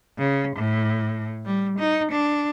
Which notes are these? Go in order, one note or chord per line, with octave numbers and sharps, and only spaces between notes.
C#3
A2
G3
D#4
D4